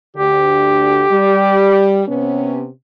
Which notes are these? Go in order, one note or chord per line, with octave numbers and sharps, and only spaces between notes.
D2 D3 G4
G3
C3 B3 C#4